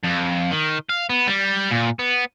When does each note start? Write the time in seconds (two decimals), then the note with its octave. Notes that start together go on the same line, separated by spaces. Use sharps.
0.03 F2
0.51 D#3
0.89 F5
1.10 B3
1.28 G3
1.72 A#2
1.99 B3